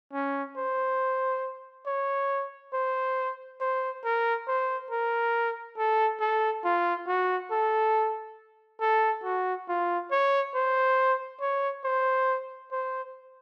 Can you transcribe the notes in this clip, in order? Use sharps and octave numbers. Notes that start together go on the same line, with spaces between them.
C#4
C5
C#5
C5
C5
A#4
C5
A#4
A4
A4
F4
F#4
A4
A4
F#4
F4
C#5
C5
C#5
C5
C5